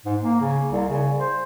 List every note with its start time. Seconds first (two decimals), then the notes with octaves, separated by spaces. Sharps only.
0.06 G#2
0.21 A#3
0.41 C#3
0.71 C2
0.89 C#3
1.18 C5